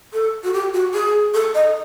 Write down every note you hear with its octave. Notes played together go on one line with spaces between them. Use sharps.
A4
F#4
G4
F#4
G#4
A4
D#5